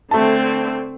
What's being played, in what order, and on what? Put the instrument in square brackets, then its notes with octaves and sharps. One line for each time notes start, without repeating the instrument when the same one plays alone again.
[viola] D3 C4 [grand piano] A3 A5